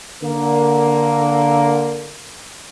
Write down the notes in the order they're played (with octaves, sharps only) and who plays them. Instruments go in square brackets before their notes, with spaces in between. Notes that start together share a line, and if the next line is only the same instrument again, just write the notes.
[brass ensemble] D3 A#3